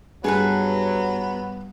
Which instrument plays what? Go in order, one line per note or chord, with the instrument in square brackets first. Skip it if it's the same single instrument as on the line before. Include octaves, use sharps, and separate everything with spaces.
[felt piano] G2 [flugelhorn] F#3 [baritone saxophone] B3 [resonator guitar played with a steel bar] G#4 A4 B4